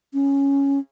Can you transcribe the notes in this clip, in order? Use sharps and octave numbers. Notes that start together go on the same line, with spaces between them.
C#4